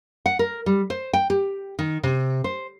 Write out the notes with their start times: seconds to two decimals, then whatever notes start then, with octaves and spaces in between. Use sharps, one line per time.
0.26 F#5
0.39 A#4
0.66 G3
0.90 C5
1.13 G5
1.30 G4
1.79 D#3
2.03 C3
2.44 C5